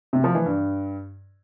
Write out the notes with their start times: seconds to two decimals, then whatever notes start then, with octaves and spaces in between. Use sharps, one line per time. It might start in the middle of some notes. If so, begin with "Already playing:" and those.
0.13 C3
0.24 F3
0.35 E3
0.46 G2